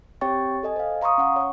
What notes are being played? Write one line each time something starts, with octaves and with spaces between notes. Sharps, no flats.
C4 G4 C#5 G5 C#6 A6
A4 D#5 G#5
C5 F5
F5 A#5 C6 C#6 D#6
C#4 F#5 C#6
C#5 F#5